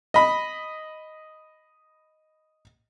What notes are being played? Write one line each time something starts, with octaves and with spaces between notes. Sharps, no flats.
D#5 B5